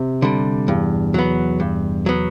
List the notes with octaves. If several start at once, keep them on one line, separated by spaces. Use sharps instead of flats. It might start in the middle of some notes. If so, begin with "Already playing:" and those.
Already playing: C3
D3 G3
E2 G2
F#3 B3
G2
F#3 B3